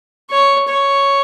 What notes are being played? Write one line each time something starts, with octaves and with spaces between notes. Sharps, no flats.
C#5
C#5